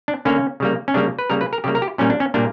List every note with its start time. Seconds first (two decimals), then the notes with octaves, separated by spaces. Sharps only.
0.08 D4
0.25 D3 A#3 C#4
0.60 C#3 G3 A#3
0.88 C#4
0.94 C#3 G3 A#3 D4
1.19 B4
1.30 C#3 G3 A#3 A#4
1.41 B4
1.53 A#4
1.64 C#3 G3 A#3 G4
1.75 A#4
1.82 G4
1.98 A#2 G3 A#3 C#4
2.10 D4
2.20 C#4
2.34 A#2 G3 A#3 D4